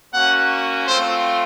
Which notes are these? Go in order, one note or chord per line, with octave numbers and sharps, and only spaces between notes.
A#3 C#4 F#4 F#5
A3 C4 F4 C5